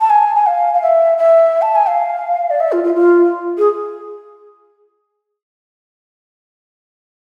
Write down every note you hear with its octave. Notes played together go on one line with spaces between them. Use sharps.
A5
G#5
G#5
F5
F5
E5
E5
A5
G#5
F5
D5
E5
F4
F4
F4
G#4